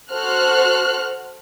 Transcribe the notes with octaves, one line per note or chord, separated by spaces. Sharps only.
F#4 A4 C5 F6 F#6